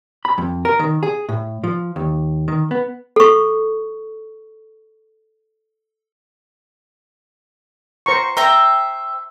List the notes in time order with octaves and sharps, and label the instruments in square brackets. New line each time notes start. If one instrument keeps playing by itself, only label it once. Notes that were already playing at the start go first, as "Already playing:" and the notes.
[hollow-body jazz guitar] B5
F2
A#4
D#3
G#4
A2
F3
D#2
D#3
B3
[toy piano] A4 C#6
[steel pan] C5 A#5 C#6
[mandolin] C5 E5 G5 [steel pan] A#5